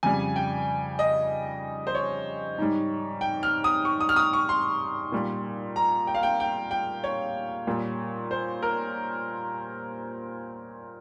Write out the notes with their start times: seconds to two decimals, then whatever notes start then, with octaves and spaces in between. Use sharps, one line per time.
0.03 F2 C#3 G3 G#5
0.36 G5
0.99 D#5
1.87 C5
1.95 C#5
2.58 G#2 G3
3.21 G5
3.43 F6
3.64 D#6
3.85 C#6
4.00 D#6
4.09 F6
4.16 D#6
4.33 C#6
4.49 C6
5.12 A#2 G3
5.76 A#5
6.07 G5
6.14 F5
6.23 G5
6.40 G5
6.71 G5
7.04 C#5
7.67 A#2 G3
8.31 C5
8.62 A#4